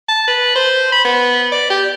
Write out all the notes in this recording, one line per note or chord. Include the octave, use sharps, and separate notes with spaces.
A5
B4
C5
B5
B3
D5
G4